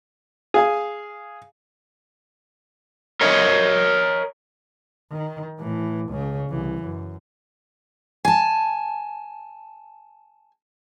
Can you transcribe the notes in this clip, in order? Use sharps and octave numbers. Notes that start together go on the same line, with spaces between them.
G#4 F5 G#5
A#4 C#5 D#5
D#3
A2 E3
C#2 C#3
C2 E3
F#2
G#5 A5